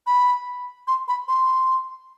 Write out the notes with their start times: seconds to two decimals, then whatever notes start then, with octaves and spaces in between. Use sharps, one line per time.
0.07 B5
0.88 C6
1.08 B5
1.28 C6